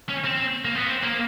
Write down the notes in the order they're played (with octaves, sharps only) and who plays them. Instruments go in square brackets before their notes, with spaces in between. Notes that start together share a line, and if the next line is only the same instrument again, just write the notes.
[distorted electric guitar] C#4
C4
A#3
B3
C4
A#3